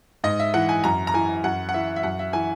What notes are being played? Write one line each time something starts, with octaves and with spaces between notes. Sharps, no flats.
G#2 D#5
E5
E3 F#5
G#5
F#2 A#5
A#5
E3 G#5
F#2 F#5
F#5
E3 E5
E5
F#2 F#5
E5
E3 G#5